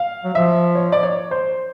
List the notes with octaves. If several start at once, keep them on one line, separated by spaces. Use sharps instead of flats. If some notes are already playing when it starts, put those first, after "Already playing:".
Already playing: F5
F#3
F3 E5
C#5
D5
C#5
C5